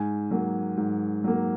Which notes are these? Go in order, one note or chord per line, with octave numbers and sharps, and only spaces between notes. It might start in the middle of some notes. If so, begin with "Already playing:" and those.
Already playing: G#2 G#5
F#3 A#3
G#2
F#3 A#3